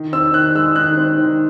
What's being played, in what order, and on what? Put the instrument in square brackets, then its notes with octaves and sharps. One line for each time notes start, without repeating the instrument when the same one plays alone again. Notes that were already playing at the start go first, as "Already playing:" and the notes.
Already playing: [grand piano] D#3
C4 E6
D#3 F#6
G#3 E6
D#3 F#6
C4
D#3